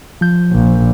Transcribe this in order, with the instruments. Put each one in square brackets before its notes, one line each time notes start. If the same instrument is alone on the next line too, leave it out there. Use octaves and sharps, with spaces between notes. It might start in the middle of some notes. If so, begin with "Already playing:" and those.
[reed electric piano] F3 G6
[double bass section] A#1